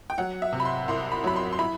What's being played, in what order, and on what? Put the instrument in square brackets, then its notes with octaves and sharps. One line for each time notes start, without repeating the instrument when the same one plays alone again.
[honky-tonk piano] G5
F#3 F#5
E5
C3
B5
C6
C2 C6
B5
F#3 B5
C6
C6
E4 B5